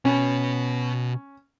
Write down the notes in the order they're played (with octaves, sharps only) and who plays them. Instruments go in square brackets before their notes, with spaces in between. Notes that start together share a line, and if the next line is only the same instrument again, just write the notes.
[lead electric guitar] B2 B4 [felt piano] C#4